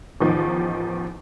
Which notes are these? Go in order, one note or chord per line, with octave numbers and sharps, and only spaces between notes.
A1 E2 D#3 F3